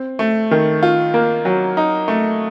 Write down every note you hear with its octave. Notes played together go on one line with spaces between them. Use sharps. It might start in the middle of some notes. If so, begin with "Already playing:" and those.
Already playing: C4
A3
D#3
F4
A#3
F#3
D#4
A3